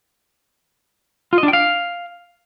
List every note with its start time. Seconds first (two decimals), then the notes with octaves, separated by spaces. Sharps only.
1.33 F4
1.38 D#5
1.43 D4
1.48 G5
1.53 F5